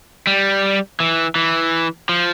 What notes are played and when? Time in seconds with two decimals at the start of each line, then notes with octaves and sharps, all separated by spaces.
0.27 G3
1.00 E3
1.36 E3
2.09 F3